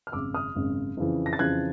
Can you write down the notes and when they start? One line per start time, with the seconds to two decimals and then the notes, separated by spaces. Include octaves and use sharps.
0.07 F6
0.12 G#1 F#2 C#3 D6 E6
0.34 D#6 F6
0.55 G#1 F#2 C#3
0.97 F2 C#3 E3
1.26 A#6
1.33 A6
1.39 F2 C#3 E3 F#6 G#6